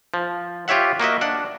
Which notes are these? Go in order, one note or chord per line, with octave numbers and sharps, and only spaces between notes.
F3
F4 G4 C#5 E5 F#5
A#3 F#4 D#5 E5
D4 F#5